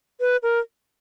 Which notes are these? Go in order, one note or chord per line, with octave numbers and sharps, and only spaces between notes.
B4
A#4